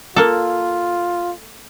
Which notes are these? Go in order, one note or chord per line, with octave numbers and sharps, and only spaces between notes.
A#3 F4 A4